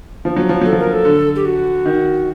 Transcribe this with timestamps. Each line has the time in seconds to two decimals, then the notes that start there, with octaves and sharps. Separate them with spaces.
0.25 F3
0.36 F#3
0.49 F3
0.61 F#3 A4
0.73 F3
0.79 A#4
0.93 A4
1.05 D3
1.36 G4
1.45 F#4
1.86 D#3